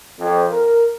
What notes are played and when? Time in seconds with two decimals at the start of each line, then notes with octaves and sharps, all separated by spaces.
0.20 F2
0.52 A#4